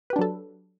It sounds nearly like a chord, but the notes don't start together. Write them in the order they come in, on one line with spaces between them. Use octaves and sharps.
B4 G4 D4 F#3 A4